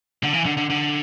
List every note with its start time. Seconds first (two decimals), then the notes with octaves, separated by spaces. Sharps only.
0.24 D3
0.33 E3
0.46 D3
0.57 D3
0.70 D3